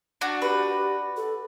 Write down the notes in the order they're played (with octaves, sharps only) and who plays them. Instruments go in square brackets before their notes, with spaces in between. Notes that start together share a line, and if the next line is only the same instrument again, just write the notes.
[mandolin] D4 F#4
[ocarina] G4 [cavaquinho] B4
[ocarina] A4